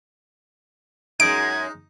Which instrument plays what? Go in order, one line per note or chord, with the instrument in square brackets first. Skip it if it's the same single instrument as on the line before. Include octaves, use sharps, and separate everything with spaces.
[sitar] F#2 G#3 [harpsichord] D#4 [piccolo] G#6 [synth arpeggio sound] D7